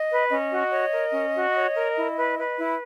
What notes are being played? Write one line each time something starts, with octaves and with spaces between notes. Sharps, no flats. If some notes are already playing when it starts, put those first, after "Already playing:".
Already playing: D#5
B4
C#4 D#5
F#4
C#5
A#4
C#4
F#4
C#5
A#4
E4
B4
B4
E4